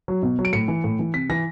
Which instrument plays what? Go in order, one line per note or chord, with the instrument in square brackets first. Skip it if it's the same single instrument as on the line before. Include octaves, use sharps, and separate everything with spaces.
[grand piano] F#3
B2
F#3
D7
A2 C#7
E3
A2
E3
C3 B6
E3 A#6